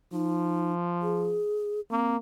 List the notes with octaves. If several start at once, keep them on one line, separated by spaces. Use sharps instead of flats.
F3 D#4
G#4
A#3 C4